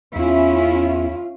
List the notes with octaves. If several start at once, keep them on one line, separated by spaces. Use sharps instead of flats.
E2 C#4 E4 F4